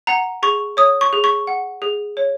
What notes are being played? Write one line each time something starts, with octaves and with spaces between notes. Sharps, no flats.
F#5 A#5
G#4 C#6
C#5 D#6
C#6
G#4
C#6
F#5
G#4
C#5